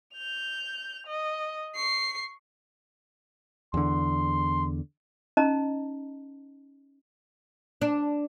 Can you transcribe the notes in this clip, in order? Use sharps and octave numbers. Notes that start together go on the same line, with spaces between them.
G6 F7
D#5
C#6 C7
E2 D3 C6
C#4 D#4 D#5 A5 A#5
D4